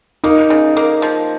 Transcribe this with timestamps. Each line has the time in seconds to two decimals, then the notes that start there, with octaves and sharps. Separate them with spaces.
0.24 A#3 D#4
0.50 C#3
0.77 A#3
1.02 F3